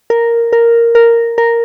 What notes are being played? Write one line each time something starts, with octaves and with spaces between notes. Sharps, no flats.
A#4
A#4
A#4
A#4